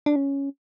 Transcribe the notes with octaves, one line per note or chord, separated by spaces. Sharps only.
D4
C#4